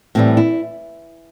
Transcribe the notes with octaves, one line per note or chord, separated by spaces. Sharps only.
A2 E3 G3 C4
E4